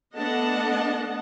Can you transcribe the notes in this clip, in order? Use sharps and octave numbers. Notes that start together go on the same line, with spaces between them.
A3 B3 D4 D#5 F#5 A5